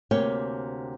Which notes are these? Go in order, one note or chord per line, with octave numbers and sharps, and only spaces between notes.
D2 C3 A#3 C#5 G5 G#5